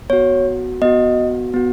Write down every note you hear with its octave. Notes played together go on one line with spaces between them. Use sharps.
B3 F#4 C#5
B3 F#4 D#5
B3 F#4